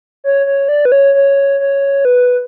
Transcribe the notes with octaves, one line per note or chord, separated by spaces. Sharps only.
C#5
C#5
D5
B4
C#5
C#5
C#5
B4